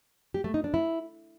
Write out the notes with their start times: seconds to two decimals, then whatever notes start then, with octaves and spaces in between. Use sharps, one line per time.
0.34 G4
0.44 A3
0.54 D#4
0.64 D4
0.74 E4